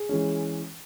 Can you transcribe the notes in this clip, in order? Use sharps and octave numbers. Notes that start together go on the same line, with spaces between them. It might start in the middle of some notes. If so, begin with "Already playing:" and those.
Already playing: G#4
E3 G#3 C#4